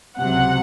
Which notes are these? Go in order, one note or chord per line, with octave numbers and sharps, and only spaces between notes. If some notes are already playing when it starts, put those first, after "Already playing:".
C#2 C3 F#3 F#5